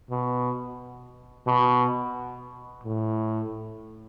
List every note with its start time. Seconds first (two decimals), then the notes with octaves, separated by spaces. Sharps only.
0.11 B2
1.47 B2
2.83 A2